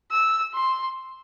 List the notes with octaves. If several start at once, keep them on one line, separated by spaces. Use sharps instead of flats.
E6
C6